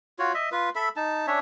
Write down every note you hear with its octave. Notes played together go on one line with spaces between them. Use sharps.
F4 F#4 C#5
D#5 E5
F4 B4
A4 E5 B5
D#4 A5
C#4 D4 C#5 E5